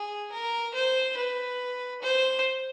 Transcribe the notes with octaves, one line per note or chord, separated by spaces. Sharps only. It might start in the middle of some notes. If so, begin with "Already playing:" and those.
Already playing: G#4
A#4
C5
B4
C5